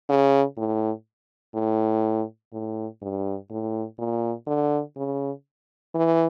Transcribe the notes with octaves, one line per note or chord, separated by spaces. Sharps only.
C#3
A2
A2
A2
G2
A2
A#2
D3
C#3
E3